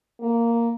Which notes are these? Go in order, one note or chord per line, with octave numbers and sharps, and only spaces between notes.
A#3